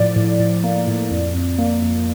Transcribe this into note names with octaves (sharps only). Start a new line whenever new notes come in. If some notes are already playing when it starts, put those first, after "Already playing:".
Already playing: A2 F3 D5
A2
A2
A#3
A2
F2
F2
A#3
F2